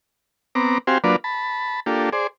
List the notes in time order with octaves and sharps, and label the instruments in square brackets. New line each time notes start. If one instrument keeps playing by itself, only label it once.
[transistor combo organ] B3 C4 A#5 D6
C4 F#4 G4 C5 F5 G#5
F#3 A#3 D4 F4 B4 D5
A5 B5
A#3 D4 F4 G4 A4
G#4 C5 D5